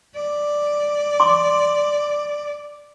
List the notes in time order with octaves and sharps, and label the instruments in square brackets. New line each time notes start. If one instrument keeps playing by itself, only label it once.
[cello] D5
[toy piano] C6 D6